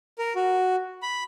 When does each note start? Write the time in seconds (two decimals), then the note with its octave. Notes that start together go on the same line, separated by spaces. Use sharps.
0.19 A#4
0.35 F#4
1.03 B5